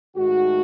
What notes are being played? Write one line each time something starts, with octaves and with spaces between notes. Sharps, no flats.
G#2 D#3 A3 F#4